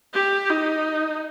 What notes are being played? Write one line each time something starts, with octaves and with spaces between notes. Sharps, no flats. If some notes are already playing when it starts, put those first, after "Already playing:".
G4
D#4